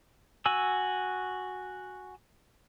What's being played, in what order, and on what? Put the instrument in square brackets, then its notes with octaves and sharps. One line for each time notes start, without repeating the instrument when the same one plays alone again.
[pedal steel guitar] F#4 G#5 E6